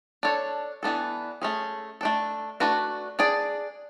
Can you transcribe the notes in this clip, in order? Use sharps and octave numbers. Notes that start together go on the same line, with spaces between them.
D4 A4 C#5
E3 B3 D4 A4
A3 C#4 G#4
A3 D4 A4
A3 D4 F#4 B4
D4 G#4 D5